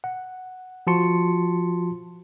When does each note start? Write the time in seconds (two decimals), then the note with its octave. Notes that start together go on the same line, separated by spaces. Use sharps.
0.04 F#5
0.87 F3 F4 F#4 A5 C6 C#7